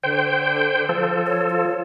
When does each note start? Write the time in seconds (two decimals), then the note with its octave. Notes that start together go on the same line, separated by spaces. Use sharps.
0.03 D3 C5 G5
0.89 F3 A4
1.27 C#5
1.50 F4